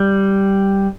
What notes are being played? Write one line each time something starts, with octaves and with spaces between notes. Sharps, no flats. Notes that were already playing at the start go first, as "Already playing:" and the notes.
Already playing: G3